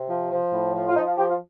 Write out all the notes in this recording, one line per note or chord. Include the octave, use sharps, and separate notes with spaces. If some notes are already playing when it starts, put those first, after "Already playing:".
Already playing: C3
F3
F3
A2
F3
F4
F3 D#4
F4
F3 G4
F4